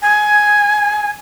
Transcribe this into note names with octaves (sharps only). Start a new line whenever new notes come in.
G#5